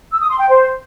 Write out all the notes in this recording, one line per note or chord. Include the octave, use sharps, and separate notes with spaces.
E6
D#6
C6
G5
C5